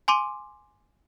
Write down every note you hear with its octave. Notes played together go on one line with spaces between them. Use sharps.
G#5 C6 D6 D#7